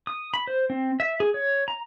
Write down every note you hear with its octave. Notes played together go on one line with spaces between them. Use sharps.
D#6
B5
C5
C4
E5
G#4
C#5
A#5